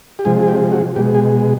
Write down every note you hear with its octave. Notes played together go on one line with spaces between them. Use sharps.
G4
C3 F3 G#3 G#4
G#4
G4
F#4
B2 G#3 G4
G#4